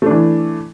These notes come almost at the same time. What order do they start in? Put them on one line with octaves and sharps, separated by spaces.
A3 D4 E3